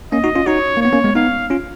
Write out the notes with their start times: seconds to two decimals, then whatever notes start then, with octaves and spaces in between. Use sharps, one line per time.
0.12 A#3 C#4 D#5
0.24 D#4 F#4
0.35 C#4 F4
0.46 D#4 F#4 C#5
0.77 A#3
0.82 B3 C#5
0.93 A#3 C#4
1.04 G#3 B3
1.15 B3 D#4 F5
1.50 C#4 F4